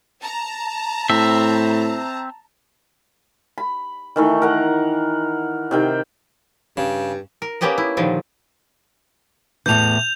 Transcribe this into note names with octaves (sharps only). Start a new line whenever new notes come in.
A5 A#5
A2 C4 E5
B5
D#3 E3 A3
A#4 F#5
C3 D#3 G5
G2 C#3
A#4
A#3 B3 C#4 G4 D#5 F#5
E4
A#2 D3 D#3 F3 G3
E2 A2 E3 G6 F7